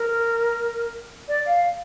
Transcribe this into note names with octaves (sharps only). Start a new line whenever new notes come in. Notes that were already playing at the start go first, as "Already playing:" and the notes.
Already playing: A#4
D5
F5